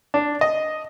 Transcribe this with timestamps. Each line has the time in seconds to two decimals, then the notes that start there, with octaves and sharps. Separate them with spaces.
0.14 D4
0.41 D#5